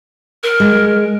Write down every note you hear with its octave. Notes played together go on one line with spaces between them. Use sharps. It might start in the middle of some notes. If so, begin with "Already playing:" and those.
A#4
G#3